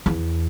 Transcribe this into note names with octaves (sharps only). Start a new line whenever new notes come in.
E2